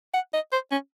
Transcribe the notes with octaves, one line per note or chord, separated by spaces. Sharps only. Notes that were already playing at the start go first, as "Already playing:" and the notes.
F#5
D#5
C5
C#4